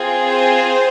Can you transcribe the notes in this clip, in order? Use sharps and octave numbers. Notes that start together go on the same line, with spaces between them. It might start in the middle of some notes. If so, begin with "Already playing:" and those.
Already playing: C4 F4 G#4
C5